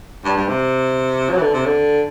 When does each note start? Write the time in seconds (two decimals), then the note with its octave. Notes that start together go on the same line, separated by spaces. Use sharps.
0.24 G2
0.36 G2
0.48 C3
1.30 F#3
1.37 E3
1.41 D3
1.53 C3
1.65 D3